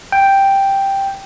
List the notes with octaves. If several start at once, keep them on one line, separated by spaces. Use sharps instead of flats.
G5